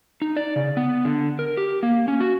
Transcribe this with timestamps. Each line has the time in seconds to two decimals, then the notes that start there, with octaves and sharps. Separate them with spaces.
0.22 D#4
0.36 D5
0.56 C#3
0.77 B3
1.05 D3
1.39 A#4
1.57 G4
1.83 A#3
2.08 C#4
2.20 F#4